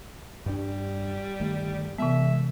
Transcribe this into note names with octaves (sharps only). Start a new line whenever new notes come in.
G2 G3 D4
G1 D#3 A3
C3 E3 G#3 B3 E5